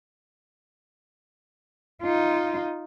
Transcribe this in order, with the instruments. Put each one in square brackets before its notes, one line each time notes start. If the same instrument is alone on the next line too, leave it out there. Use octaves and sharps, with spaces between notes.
[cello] D#4 F4